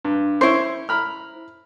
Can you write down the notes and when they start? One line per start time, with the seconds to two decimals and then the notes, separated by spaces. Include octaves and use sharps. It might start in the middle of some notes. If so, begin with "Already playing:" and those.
0.05 G2
0.41 C#4 E4 C5 C6 C#6
0.89 A#5 B5 F6